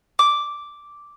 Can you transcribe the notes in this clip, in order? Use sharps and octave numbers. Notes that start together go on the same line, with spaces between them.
D6